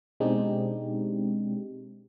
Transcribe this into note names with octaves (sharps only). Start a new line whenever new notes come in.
B2 G#3 C4 D4 D#4 G4